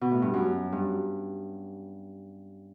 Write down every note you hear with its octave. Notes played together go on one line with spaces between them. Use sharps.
B2
A2
G2
F#2
G2